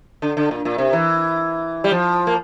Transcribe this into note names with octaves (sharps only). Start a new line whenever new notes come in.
D3
D3
A#2
A#2
C3
E3
G3
F3
A#3